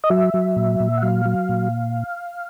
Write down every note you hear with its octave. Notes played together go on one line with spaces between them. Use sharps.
D#5
F#3 E5
F#3
A#2
A#2
F#5
F#3 F5
F#3
A#2